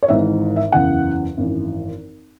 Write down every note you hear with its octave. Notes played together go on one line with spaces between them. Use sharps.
C#5
G#1 G#2 E3 E5
E5
F#1 E2 C#3 E3 F#5
G#1 F#2 E3